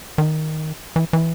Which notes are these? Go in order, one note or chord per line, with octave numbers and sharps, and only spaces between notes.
D#3
E3
E3